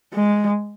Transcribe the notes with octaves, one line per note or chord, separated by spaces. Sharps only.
G#3